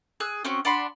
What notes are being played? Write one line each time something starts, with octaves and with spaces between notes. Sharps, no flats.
G#4 E6 F#6
C4 C#4 F#4
D4 F#5 B5 C6